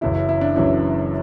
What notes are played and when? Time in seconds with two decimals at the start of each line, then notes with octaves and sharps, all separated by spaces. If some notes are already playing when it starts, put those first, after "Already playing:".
0.01 F#1 F#2 C#3 E3 E4
0.15 E4
0.29 E4
0.41 D4
0.56 F#1 F#2 C#3 E3 E4